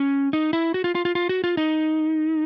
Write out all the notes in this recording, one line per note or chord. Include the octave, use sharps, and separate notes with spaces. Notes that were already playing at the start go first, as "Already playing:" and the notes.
Already playing: C#4
D#4
E4
F#4
F4
F4
F4
F4
F#4
F4
D#4